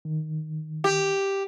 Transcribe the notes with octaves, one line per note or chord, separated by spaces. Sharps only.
D#3
G4